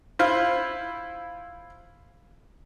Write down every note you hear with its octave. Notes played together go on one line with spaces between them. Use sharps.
E4 F4 C5 F5